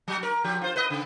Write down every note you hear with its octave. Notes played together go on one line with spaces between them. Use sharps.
F#3
A#4
F3 G4
F4 C5
B4 D#5
C#3